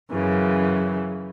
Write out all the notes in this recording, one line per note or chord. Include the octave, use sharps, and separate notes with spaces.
F#2 C#3 E3